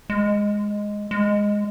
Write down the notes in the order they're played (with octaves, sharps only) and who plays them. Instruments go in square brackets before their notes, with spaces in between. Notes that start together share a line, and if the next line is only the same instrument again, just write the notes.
[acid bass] G#3
G#3